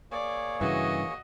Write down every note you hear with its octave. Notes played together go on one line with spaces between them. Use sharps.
A#3 G#4 C#5 D5
G2 C#3 E3 F#4 D#5